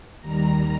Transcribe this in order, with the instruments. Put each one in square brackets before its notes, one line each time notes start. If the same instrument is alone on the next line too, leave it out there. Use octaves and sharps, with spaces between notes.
[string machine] D#2 D#3 G3 A#5